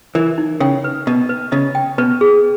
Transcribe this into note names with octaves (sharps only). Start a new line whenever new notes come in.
E3 A#4
D#4
C#3 G5
B4
B2 D#5
B4
C#3 D#5
G5
B2 B4
G#4